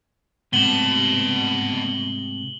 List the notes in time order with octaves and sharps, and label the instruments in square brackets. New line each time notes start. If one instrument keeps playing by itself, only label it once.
[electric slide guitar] G#2 C3 A3 [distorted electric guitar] B3 A5 [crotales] F#7 G7